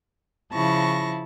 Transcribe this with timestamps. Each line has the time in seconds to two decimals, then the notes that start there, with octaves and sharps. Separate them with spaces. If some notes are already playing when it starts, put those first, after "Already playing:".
0.52 C#3 F3 E4 A5 C#6 A#6